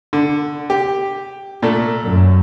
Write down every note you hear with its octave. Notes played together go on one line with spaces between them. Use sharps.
D3
G4
A#2 A3 A4
F#2